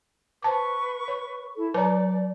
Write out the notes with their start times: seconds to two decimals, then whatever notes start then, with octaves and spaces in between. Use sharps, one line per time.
0.42 B4 C5 A5 C#6 D6
1.08 C#5
1.55 E4 A4
1.74 F#3 B4 C#5 D5 A#5